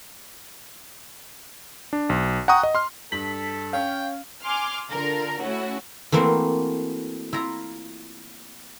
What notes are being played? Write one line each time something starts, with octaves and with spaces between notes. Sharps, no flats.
D4
B1
F#5 G5 A#5 C#6 D#6
D#5
C6 F6
G2 A4 B6 F#7
C#4 F5 G5
G#5 C6 D6 F6
D3 F4 A4 A#4
A3 C#4 E4 F#4
E3 A3 A#3 C4 F#4 C5
E4 F4 A#5